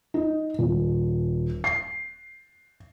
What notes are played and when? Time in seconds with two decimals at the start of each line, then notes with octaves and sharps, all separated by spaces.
0.14 D#4
0.59 D#1
1.64 C7